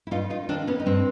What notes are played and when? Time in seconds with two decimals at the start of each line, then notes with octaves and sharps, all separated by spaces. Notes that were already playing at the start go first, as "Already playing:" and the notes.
0.07 E4
0.11 G2 D#4 F4
0.30 D#4 F4
0.49 D#3 C4 D4
0.67 B3 C#4
0.80 D#4
0.86 G2 C4 D4